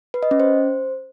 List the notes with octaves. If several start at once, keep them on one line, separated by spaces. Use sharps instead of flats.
B4
D#5
C#4
C5